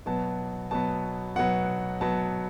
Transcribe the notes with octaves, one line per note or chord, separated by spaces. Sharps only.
B2 F#3 B3 A5
B2 F#3 B3 A5
B2 F#3 B3 F#5
B2 F#3 B3 A5